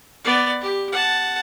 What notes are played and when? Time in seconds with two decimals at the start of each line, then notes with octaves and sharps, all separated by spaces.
0.24 B3 D5
0.61 G4
0.92 F#5 A5